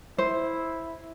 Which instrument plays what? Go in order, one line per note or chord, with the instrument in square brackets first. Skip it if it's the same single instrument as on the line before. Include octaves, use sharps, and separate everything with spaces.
[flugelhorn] E4 [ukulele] C5